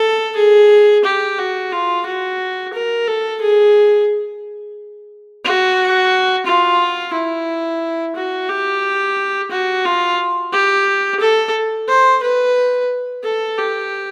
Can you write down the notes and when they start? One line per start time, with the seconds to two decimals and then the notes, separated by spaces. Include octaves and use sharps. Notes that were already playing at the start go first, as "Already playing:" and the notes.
Already playing: A4
0.36 G#4
1.04 G4
1.38 F#4
1.72 F4
2.06 F#4
2.73 A#4
3.07 A4
3.41 G#4
5.44 F#4
6.46 F4
7.14 E4
8.15 F#4
8.49 G4
9.51 F#4
9.85 F4
10.53 G4
11.20 A4
11.88 C5
12.22 B4
13.24 A4
13.57 G4